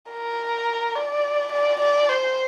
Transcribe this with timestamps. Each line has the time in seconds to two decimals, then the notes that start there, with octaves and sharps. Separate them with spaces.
0.11 A#4
0.95 D5
1.52 D5
1.81 D5
2.09 C5